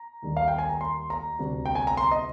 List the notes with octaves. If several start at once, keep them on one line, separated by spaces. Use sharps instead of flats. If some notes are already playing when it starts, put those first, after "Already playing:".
Already playing: A#5
D#2 D#3 G3
F5
G5
G#5
A#5
C6
A#5
D2 C3 G3
G5
G#5
A#5
C6
D#5